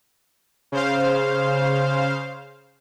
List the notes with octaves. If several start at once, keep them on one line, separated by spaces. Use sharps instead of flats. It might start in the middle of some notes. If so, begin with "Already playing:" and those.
C#3 C5 F5